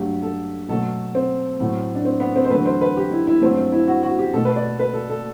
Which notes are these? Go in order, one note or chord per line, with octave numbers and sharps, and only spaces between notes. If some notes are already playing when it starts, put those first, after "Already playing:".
Already playing: G2 F#3 A3 G4
A4
B2 F#3 A3 A4
C4
A2 F#3 A3
D4
C4
B3
C4
C5
E2 D3 F#3 A3 B4
C5
B4
G4
E4
E4
G2 F#3 A3 C4
C4
E4
F#4
F#4
G4
B2 A3 A4
B4
D5
B4
A4
A4